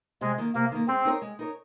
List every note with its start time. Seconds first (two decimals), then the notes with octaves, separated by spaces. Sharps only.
0.21 C3 G#3
0.38 D#3 A#3
0.55 C3 A#3
0.72 D#3 A#3
0.88 G#3 C4
1.05 D#4 A#4 C#5
1.22 G#3
1.39 D#4 A#4 C#5